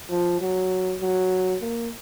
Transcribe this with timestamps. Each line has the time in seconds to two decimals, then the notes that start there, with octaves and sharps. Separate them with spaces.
0.10 F3
0.40 F#3
1.01 F#3
1.62 A#3